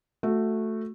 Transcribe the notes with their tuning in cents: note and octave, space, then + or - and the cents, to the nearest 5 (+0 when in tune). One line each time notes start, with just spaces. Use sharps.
A3 +0 F#4 -15